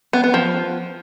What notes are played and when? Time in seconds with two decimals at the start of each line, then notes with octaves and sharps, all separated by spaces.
0.13 B3
0.24 B3
0.34 F3